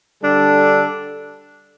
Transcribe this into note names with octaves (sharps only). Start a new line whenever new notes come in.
D3 G3 D4 A4